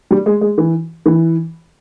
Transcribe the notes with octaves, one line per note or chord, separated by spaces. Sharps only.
G3
G#3
G#3
E3
E3